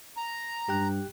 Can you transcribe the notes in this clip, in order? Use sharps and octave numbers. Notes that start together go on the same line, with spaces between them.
A#5
G2 G4 G5 F#6